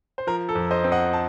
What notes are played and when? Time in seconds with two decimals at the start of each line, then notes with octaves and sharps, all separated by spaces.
0.18 C5
0.27 F3 A#4
0.49 A4
0.55 F2
0.71 C5 D#5
0.84 C4
0.92 D#5 F#5
1.13 A5